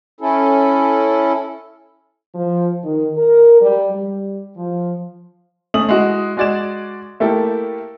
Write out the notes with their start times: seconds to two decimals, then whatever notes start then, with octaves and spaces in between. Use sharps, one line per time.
0.21 C#4 E4 A4
2.35 F3
2.85 D#3
3.17 A#4
3.61 G3
3.92 G3
4.57 F3
5.74 A3 C#4 D#6 F#7
5.89 G#3 E4 F#4
6.37 G#3 F#4 D5 G#6 E7
7.20 A3 A#3 E4 G4 A4